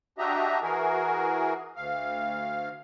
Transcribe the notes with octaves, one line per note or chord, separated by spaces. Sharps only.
D4 F#4 G4 D#5 E5 A#5
E3 F#4 G#4 A#4
D2 F5